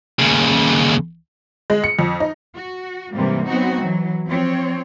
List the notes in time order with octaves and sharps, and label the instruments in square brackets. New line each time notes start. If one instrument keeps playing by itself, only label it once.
[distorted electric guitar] D#2 C#3
[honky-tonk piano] G#3
C#7
F2
D#4
[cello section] F#4
G#2 C3 E3 G3 A#3
F#3 B3 C4 D#4 F#4
E3 F#3
F3 C4 C#5